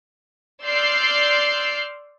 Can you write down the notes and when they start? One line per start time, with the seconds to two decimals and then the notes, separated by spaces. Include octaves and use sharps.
0.65 D5 C6 E6 F6 G6 C7